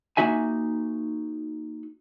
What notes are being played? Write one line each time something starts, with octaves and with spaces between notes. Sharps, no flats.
A#3 C#4 D#4 F#4 E5 G#5